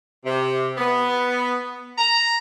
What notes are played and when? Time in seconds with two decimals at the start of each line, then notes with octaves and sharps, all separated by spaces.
0.26 C3
0.78 B3
1.97 A#5